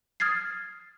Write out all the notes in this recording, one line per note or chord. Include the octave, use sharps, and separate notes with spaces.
D#6 F6 G#6 A6 C7